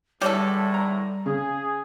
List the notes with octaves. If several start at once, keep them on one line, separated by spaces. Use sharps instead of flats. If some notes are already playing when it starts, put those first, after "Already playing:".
E2 A2 D3 G3 G4 A4 C#5
A#5
C#3 G#4